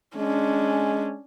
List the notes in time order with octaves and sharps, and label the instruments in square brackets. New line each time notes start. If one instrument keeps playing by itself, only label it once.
[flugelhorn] G#3 [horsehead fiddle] C#4 D4